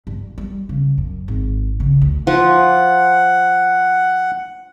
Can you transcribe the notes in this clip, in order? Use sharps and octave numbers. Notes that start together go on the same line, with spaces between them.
G2
G3
C#3
F#2
G#1
C#3
D2
F3 F#5